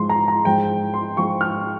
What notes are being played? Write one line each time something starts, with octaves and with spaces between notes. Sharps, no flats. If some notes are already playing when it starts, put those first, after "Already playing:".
Already playing: G#2 F3 G#3 C6
A#5
A#5
G#2 F3 G#3 G5
C6
G#2 F3 G#3 C#6
F6